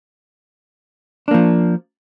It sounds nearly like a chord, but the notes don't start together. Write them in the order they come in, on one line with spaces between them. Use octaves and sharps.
D4 A#3 F3